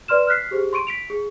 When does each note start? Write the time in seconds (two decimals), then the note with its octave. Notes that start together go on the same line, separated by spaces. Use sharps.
0.08 B4 D5 C6 F6 E7
0.27 F6 F#6 B6 C7
0.51 G4 G#4 C5
0.73 C6 C#6 D7 D#7
0.87 B6 D7 F7
1.10 G#4